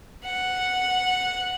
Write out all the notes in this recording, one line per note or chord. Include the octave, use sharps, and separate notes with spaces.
F#5